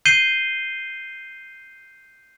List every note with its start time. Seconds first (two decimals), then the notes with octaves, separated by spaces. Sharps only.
0.05 G6 C7 D#7 G7